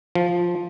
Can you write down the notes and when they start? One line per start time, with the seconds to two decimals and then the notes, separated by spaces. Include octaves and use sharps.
0.15 F3